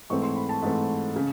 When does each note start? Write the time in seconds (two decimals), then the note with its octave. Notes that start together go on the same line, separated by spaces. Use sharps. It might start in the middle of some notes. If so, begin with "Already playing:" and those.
0.10 G#2 E3 A3 C4 C#6
0.23 C6
0.36 B5
0.49 A5
0.62 G#2 E3 A3 C4
1.16 C#3